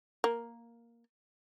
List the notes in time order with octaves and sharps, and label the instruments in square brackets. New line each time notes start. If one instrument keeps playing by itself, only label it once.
[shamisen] A#3